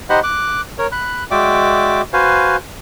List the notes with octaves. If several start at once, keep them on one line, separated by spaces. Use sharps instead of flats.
D#4 G4 C5 D#5 F#5 B5
D6 F#6
A#4 C#5
B5 F#6
G#3 F#4 D5 E5 G5 D6
F#4 B4 C5 F5 G#5